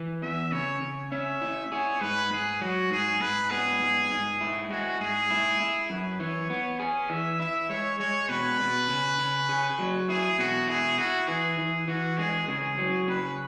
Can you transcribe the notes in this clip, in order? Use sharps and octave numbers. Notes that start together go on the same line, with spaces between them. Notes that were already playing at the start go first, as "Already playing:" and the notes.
Already playing: E3
E2 E5
C#3 C#5
C#3
C#4 E5
E4
G#4 C#5
G#2 B4
G#2 G#4
F#3 F#4
G#2 G#4
G#2 B4
B3 G#4
G#2
G#2
E4
G#3 F#4
G#2 G#4
E4
E4
F#2 B4
E3 C#5
B3 C#5
C#4 G#4
E3 E5
E4 E5
G#3 C#5
G#3 C#5
B2 B4
B2
C#3
C#3
G#4
F#3
E4 G#4
B2 F#4
E4 G#4
E4 F#4
E3 G#4
E3
E3 F#4
G#3 G#4
C#3 G#4
F#3
C#3 B4